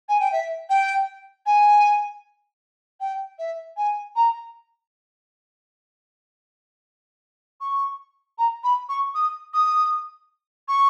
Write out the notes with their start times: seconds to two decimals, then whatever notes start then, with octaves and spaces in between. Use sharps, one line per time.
0.09 G#5
0.20 G5
0.32 E5
0.70 G5
1.46 G#5
3.01 G5
3.39 E5
3.77 G#5
4.16 A#5
7.61 C#6
8.38 A#5
8.64 B5
8.89 C#6
9.15 D#6
9.54 D#6
10.68 C#6